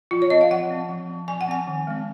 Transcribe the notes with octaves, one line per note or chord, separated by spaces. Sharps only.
F3 F4
C#5
C4 D#5
F5
F3 F#5
C4
F3
C4
F3 G#5
F#5
C4 G#5
D#3
G#3 C4